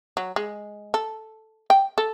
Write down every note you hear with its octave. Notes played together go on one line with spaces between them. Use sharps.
F#3
G#3
A4
G5
A4